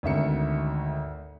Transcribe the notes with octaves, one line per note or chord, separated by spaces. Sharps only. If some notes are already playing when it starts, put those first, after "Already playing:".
G#1 D2 E5 C#7